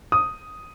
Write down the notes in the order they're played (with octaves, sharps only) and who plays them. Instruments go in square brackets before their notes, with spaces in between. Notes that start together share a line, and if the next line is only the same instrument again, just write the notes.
[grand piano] D#6